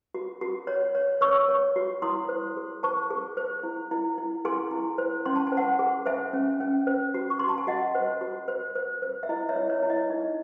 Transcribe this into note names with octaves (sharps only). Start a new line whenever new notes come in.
F#4
F#4
C#5
C#5
C#5 C#6 E6
C#5
F#4
E4 C6 D#6
C5
G#4
C5 A5 C#6
G#4
C5
E4
E4
E4
G#4 G#5 C6
E4
C5
C#4 C6
A5
G#5
C5
F#5 A5
G#4
C5 E5 G#5
C#4
C#4
C5
F#4
C#6
F#4 C6
A5
G#5
F#4 D#5 F#5
C5
F#4
C5
C5
C5
E5
E4 D#5
C#5 E5
E4
C#5
E4
D#5
D#4